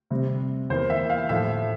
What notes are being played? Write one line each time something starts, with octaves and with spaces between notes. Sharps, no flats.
C3 G3 C4
E2 E3 A#3 C5
E5
F5
A2 F3 A3 E5